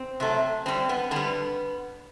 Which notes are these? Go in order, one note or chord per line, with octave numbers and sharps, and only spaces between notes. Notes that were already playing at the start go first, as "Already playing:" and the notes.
Already playing: C4
C3 F#3 A3
D3 G3 C4
B3
D3 G3 B3